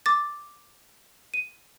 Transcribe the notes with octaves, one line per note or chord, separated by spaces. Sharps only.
D6 A6
D#7